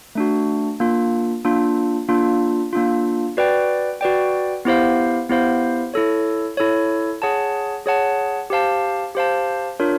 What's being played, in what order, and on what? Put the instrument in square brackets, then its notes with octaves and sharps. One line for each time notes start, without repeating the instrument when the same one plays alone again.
[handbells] A3 D4 F#4
A#3 D4 F4
A#3 D4 F4
A#3 D4 F4
A#3 D4 F4
F#4 B4 D5 G5
F#4 B4 D5 G5
B3 E4 G4 C5 F5
B3 E4 G4 C5 F5
E4 A4 C#5
E4 A4 C#5
G#4 C#5 F#5 A5
G#4 C#5 F#5 A5
G4 C5 F5 A5
G4 C5 F5 A5
D4 F4 A#4 C#5